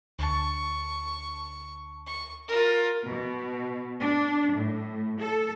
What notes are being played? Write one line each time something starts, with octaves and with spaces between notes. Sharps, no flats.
D2 A5 C#6
C#6
F4 A#4
B2
D4
A2
A4